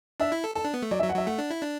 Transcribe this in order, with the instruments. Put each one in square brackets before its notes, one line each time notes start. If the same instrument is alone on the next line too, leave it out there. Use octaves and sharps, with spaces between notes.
[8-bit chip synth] D4 [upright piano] E5
[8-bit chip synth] E4
A4
[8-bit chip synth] A4 [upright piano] A5
[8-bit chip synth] D4
B3
A3
[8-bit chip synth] F#3 [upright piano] D5
[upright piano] E5
[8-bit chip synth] F#3
[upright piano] F#5
[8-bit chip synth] F#3 [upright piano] E5
[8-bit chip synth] A3 [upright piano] F#5
[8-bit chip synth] D4
E4
D4